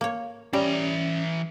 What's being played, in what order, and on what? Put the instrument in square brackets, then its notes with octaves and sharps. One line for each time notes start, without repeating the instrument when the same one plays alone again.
[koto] A#3 C#5
[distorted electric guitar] E3 A#5 [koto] G3 [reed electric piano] C#4